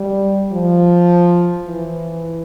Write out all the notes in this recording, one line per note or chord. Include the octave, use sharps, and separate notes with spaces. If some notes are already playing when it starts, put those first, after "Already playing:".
Already playing: G3
F3
E3